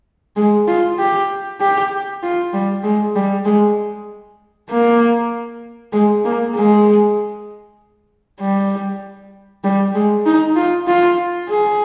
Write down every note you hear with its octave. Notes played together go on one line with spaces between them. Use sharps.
G#3
F4
G4
G4
F4
G3
G#3
G3
G#3
A#3
G#3
A#3
G#3
G3
G3
G#3
D#4
F4
F4
G#4